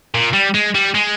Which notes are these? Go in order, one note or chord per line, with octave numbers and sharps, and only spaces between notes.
A#2
G3
G#3
G3
G#3